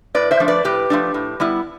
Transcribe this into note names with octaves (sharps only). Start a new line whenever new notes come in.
A2 B4 D5
C5 E5
F3 A3 D4
B4 D5
A2 G4 B4
F3 A3 D4
A2
G3 B3 E4